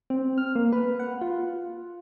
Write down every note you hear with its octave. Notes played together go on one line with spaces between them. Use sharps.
C4
F6
A#3
B4
F#5
F4